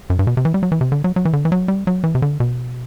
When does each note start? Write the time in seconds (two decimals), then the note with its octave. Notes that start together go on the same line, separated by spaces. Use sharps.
0.10 F#2
0.19 G2
0.27 B2
0.37 C3
0.45 E3
0.54 G3
0.63 F#3
0.72 E3
0.81 C3
0.92 D3
1.04 F#3
1.16 F#3
1.25 E3
1.33 D3
1.45 E3
1.52 F#3
1.68 G3
1.87 F#3
2.04 E3
2.15 C3
2.22 D3
2.40 B2